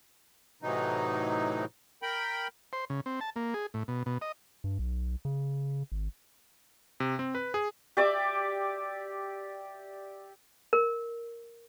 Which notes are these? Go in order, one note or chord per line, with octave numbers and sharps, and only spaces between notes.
A2 C3 E3 F#3 D#4
A#4 G5 B5
C5
C#3
C4
A5
A#3
G#4
A2
B2
B2
D#5
G2
B1
C#3
G#1
C3
C4
B4
G#4
G4 D5 E5 D6
A#4